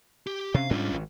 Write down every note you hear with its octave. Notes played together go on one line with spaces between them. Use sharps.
G4
C3 C#4 F5
G#2 G3 C#4 D4 F4
G#1